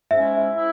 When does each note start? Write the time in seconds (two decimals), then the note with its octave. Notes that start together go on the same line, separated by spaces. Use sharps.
0.11 G#2 G#3 C#4 E4 E5
0.56 E4